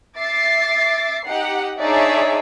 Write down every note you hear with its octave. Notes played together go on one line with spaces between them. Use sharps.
E5 D6 A6 C7
D#4 G4 F#5
D4 D#4 G#4 C#5 D5 E5